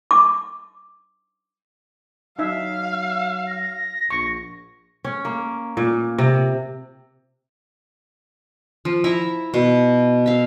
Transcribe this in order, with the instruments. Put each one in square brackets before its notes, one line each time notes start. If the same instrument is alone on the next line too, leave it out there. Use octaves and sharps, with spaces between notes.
[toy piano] D6
[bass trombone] F#3 [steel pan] D#4 E5 [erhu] F5
[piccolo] A#6
[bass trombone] A#1 [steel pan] C#6
[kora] C#4
A#3
A#2
C3
[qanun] F3
E4 E5 A#5
B2
E5 F5